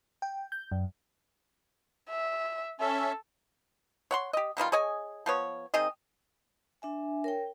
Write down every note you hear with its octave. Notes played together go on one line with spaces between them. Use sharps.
G5
G6
F#2
E5
C#4 A4 E5
C#5 F#5 C6
G4 D#5
B2 D#3 G3 F4
G#4 C#5 D#5 G#5
F3 B3 C#5
D#3 C4 G#4 D#5
D4 E5 G#5
A#4 C#5 G5